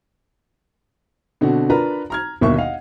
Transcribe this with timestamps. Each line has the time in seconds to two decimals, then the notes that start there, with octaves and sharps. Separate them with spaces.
1.41 B2 D3 C4 F#4
1.70 D4 F4 A#4 B4 A#5 B5
2.10 A#5 F6 G#6
2.41 G1 D#2 B2 A#3 E5 C#6
2.56 D#5 F5 F#5